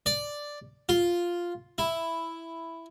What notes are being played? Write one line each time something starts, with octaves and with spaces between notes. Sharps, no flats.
D5
F4
E4